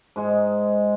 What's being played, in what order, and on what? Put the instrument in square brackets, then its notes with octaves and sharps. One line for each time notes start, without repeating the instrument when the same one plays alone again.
[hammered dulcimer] G#2 G#3